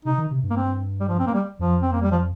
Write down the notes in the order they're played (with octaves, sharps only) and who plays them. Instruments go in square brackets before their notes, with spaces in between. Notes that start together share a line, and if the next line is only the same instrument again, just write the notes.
[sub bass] C3 [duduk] D#4
[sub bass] D#3
C3
G2
[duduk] A#3
C4
G3
F3
C4
A#3
G3
[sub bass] F2 [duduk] F3
[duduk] C4
A#3
G3
F3